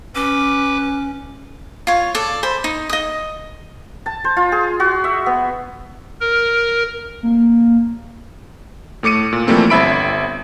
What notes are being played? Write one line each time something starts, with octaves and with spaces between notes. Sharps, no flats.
C#4 B4 D6
F4 C#5
A4 D5
C5 B5
D#4
D#5 D#6
A5
C5
F4
G#4
F#4
E5
B3
A#4
A#3
A2 A3 D6 C#7 D#7
A#2
E3 F3 G3 A3 A#3 C4
G1 C4 E5 B5 D7